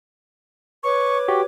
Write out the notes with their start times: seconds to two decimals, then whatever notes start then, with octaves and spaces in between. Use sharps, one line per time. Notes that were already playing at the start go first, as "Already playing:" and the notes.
0.83 B4 C#5 C#6 D6
1.28 F#4 G4 G5